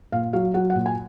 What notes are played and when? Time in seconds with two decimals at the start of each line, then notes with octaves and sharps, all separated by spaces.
0.12 A#2 F5
0.33 F#3 F5
0.54 F#3 F#5
0.70 F#5
0.75 A#2
0.86 G#5